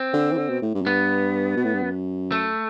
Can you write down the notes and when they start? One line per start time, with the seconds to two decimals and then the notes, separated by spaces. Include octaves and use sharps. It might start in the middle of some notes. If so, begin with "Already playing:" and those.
Already playing: C4
0.14 D3
0.33 E3
0.38 D3
0.49 B2
0.62 A2
0.75 G2
0.82 F#2
0.87 G2 B3
1.57 B2
1.65 A2
1.74 G2
1.83 F#2
2.32 A3